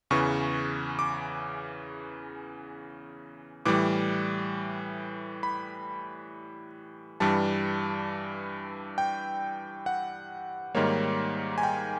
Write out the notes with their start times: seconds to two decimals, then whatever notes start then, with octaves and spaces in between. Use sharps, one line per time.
0.10 E2 C#3 E3 C#6
0.99 D6
3.65 A2 E3 G3 D6
5.43 B5
7.20 G2 E3 G3 A5
8.98 G5
9.86 F#5
10.75 G#2 D#3 G3 A#3 C#5
11.58 G#5
11.63 G5